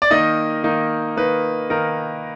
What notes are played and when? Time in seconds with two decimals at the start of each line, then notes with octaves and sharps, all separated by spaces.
0.02 D5
0.10 D#3 A#3 D#4 D#5
0.64 D#3 A#3 D#4
1.17 D#3 A#3 D#4 B4
1.70 D#3 A#3 D#4 A#4